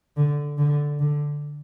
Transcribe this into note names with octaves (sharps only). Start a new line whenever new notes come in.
D3
D3
D3